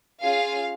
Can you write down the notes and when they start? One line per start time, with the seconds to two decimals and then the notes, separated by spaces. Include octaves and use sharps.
0.24 C#4 F4 G#4 F5